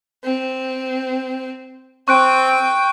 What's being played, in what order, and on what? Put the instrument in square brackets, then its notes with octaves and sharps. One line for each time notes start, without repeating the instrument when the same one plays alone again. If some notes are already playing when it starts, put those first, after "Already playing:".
[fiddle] C4
[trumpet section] C4 [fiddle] G5 [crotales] C#6 F#6 D7